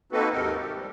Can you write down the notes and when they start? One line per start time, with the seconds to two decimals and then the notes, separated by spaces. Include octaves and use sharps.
0.12 A#3 C4 D#4 F#4 A4 B4
0.32 D#2 G#2 C3 D#4 A4 A#4
0.55 G4
0.75 F3 G3